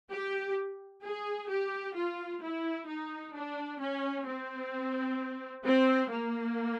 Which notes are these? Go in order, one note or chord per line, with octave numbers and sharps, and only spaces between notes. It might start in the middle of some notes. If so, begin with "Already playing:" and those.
G4
G#4
G4
F4
E4
D#4
D4
C#4
C4
C4
A#3